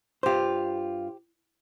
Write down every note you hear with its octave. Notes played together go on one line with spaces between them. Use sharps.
G2 F4 G4 C5